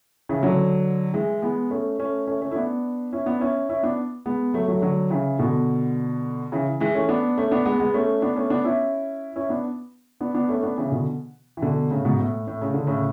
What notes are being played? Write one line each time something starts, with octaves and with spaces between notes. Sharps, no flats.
C#3 E3
D3 F#3
E3 G#3
G#3 B3
A3 C#4
A3 C#4
A3 C#4
A3 C#4
E4
B3 D4
C#4 E4
B3 D4
C#4 E4
C#4 E4
B3 D4
G#3 B3
F#3 A3
F#3 A3
D3 F#3
C#3 E3
B2 D3
C#3 E3
E3 G#3
A3 C#4
B3 D4
A3 C#4
B3 D4
G#3 B3
G#3 B3
A3 C#4
B3 D4
A3 C#4
B3 D4
C#4 E4
C#4 E4
B3 D4
B3 D4
B3 D4
A3 C#4
B3 D4
C#3 E3
B2 D3
E3
B2 D3
A2 C#3
G#2 B2
A2
A2
C#3
D3
A2 C#3